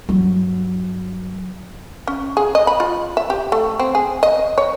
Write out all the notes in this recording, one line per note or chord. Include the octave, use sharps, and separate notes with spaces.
G2 F#3
C#4
G#4
D#5
B5
F4
E5
G4
A3
C4
G#4
D#5
C#5